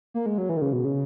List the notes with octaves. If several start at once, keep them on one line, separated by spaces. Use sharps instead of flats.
A#3
G#3
F#3
E3
D#3
C#3
B2
C#3